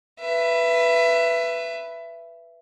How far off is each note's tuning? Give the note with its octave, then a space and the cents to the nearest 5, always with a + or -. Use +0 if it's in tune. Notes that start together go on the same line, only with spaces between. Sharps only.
B4 +0 E5 +25